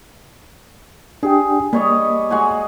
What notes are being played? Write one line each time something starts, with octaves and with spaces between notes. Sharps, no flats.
D4 G4 G#4 G5
G3 A#3 C#5 D#5
G#3 F#4 G#5